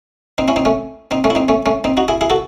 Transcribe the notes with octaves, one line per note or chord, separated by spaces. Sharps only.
C4 D#4
C#4 E4
C4 D#4
A3 C#4
C4 D#4
A3 C#4
E4
C4 D#4
A3 C#4
A3 C#4
C4 D#4
D#4 F#4
E4 G#4
E4 G#4
F#4 A4